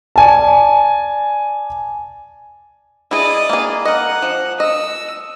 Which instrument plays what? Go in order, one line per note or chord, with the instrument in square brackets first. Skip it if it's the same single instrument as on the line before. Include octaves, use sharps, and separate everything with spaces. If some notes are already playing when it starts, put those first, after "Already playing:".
[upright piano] D5 G#5 A5
[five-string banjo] E4 G#4 [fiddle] D5 D#5
[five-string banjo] A#3 G#4
[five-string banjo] A#4 D#5 [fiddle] F#5
[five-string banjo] F3
[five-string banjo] D#5 [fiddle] E6